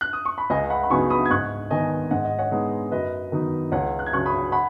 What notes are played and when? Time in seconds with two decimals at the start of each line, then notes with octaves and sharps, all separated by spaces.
0.01 F#6
0.13 D#6
0.25 C#6
0.38 B5
0.50 C#2 D#5 G#5
0.70 F#5 B5
0.83 B5
0.90 C#3 F#3 B3 D#4 G#5 C#6
1.10 B5 D#6
1.26 G#6
1.30 G#2 C#6 F#6
1.70 D#3 B3 D#4 D#5 G#5
2.11 G#2 F#5
2.25 D#5
2.39 C#5 F#5
2.52 G#3 B3 D#4
2.91 F#2 B4 D#5
3.32 D#3 F#3 B3 D#4
3.72 C#2 C#5 F#5
3.99 F#6
4.06 G#6
4.13 C#3 F#3 C#4 C#6 F#6
4.26 B5 D#6
4.52 F#5 B5